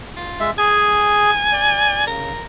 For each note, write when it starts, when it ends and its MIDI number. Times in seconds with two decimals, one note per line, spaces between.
0.16 0.49 65
0.40 0.51 56
0.40 0.51 76
0.58 1.31 68
0.58 2.03 80
1.52 2.07 74
2.07 2.32 49
2.07 2.46 70